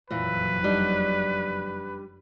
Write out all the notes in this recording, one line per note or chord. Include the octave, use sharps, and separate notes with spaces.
F#1 F2 A#2 E3 F#3 B4
G3 D4 D#4